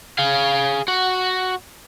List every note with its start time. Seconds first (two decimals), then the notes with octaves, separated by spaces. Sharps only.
0.18 G#4 F5
0.88 F#4